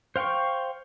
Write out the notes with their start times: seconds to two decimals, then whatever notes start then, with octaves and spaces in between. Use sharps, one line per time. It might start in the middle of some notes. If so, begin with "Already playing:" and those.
0.16 C5 F5 G5 C6 C#6